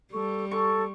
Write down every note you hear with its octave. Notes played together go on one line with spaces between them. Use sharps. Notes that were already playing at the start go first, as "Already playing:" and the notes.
G3 A4 C#6
A4 C#6